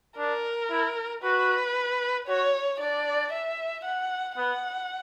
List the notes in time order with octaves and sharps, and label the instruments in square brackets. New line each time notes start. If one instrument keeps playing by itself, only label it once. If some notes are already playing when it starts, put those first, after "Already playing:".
[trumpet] D4 [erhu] A#4
[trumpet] E4
[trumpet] F#4 [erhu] B4
[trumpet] F#4 [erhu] C#5
[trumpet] D4 [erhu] D5
[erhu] E5
F#5
[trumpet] B3 [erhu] F#5